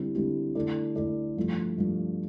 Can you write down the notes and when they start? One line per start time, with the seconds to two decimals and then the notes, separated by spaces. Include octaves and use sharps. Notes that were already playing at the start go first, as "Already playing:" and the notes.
Already playing: D3 G3 C4 E4 G4
0.15 D3 G3 C4 E4 G4
0.55 D3 A3 E4 A4 D5
0.96 D3 A3 E4 A4 D5
1.37 G2 F3 A3
1.77 G2 F3 A3